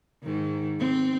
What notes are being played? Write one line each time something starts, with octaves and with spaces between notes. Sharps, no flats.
G#2 D#3
C4